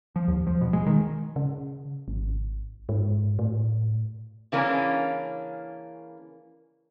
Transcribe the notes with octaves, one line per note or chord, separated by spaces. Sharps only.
F3
D#2
F3
B2
G#3
D#3
C#3
G#1
G#2
A2
C#3 E3 A#3 C#4 D4